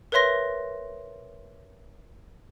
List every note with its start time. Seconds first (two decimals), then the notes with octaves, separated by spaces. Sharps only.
0.12 A#4 B4 C#5 E5 C6 A#6